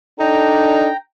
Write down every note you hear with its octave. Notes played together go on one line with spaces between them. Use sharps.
D4 D#4 A4 G5 A#5